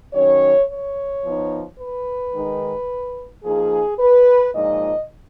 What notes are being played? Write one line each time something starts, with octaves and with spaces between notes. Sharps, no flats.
D#3 F#3 C#4 C#5
C#5
F3 B3 D#4
B4
D#3 G#3 D#4
F3 A#3 D#4 G#4
B4
A#2 F3 G#3 D#4 D#5